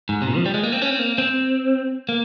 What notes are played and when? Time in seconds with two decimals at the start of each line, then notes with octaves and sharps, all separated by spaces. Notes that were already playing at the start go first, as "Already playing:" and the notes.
0.09 G#2
0.22 C3
0.28 A#2
0.36 F3
0.46 G3
0.54 G#3
0.63 A#3
0.72 C4
0.82 C#4
0.90 C4
0.99 A#3
1.18 C4
2.09 A#3